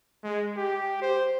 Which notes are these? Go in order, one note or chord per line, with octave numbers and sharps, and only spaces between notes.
G#3
G4
C5